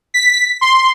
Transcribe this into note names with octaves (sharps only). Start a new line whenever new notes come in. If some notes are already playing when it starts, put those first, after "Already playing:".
B6
C6